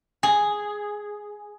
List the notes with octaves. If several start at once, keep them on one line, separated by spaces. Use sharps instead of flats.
G#4